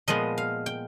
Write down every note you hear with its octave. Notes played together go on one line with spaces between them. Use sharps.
A#2 F3 G#3 B3 D#5
F5
G5